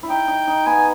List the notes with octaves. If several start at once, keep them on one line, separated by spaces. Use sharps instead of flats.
E4
D#4 G5
D#4
D#4
B3 G#5